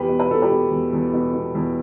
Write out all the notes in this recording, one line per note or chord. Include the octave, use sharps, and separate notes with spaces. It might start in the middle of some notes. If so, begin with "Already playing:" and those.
Already playing: E2 G4 B4
B2
B4
B2 A4
G4 B4
B2
E2
E2
B2
B2
E2